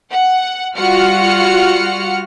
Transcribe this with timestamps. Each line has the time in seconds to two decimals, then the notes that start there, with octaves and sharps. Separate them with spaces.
0.11 F#5
0.75 G3 F4 F#4 F#5 F6 C#7